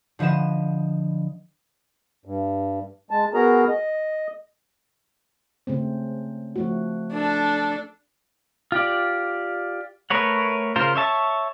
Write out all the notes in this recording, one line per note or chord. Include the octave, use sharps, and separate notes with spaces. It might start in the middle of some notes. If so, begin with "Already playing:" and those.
D3 F3 B4 D#5 E7
G2
G#3 A5
B3 F#4 G#4 A#4 A#5
D#5
C#3 A3 C4
F3 A3 F#4
D4 A4
F4 G4 D5
A3 A#4 B4 C#5 F#5
C#3 F4 A#4 C5
C#5 E5 A5 C#6